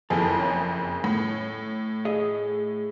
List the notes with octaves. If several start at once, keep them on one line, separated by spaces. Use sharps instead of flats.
F#1 F2 E4 G#4 A4
C#4
A2
G#4 D#5 E5